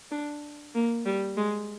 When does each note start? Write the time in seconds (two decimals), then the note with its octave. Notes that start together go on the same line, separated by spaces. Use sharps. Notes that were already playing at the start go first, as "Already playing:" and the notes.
0.11 D4
0.75 A#3
1.06 G3
1.37 G#3